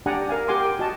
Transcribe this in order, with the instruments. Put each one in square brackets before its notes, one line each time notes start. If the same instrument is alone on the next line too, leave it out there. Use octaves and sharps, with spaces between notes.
[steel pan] D4 G4 D5 F#5 G#5 A#5
A#4 F5 G#5
G4 A#4 F#5 G#5 C6 D6
G5
F#4 D#5 A5